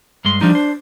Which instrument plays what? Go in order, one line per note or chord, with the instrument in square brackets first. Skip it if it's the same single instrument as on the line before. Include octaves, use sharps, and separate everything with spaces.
[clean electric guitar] G2 G#3 C6
[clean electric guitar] F3 G3 D#4 [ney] D4
[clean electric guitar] C5